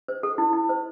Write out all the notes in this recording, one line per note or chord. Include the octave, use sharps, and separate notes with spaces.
C5
A4
E4
E4
C5